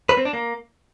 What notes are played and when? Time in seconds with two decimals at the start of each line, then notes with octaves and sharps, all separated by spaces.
0.09 B4
0.17 C4
0.25 D4
0.33 A#3